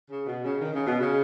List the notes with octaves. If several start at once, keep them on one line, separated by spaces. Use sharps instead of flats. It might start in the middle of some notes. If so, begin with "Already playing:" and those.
C#3
B2
C#3
D#3
C#3
B2
C#3